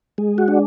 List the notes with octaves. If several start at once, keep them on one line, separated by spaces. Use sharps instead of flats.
G#3
F#4
D4